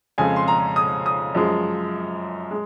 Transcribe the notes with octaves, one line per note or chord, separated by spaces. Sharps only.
F2 C#3 G#3 G#5
C6
A#5
D#6
D#6
F#2 F3 G#3
G#3